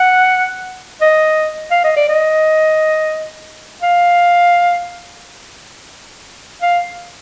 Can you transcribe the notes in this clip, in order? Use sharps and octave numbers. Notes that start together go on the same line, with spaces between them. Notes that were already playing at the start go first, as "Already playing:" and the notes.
Already playing: F#5
D#5
F5
D#5
D5
D#5
F5
F5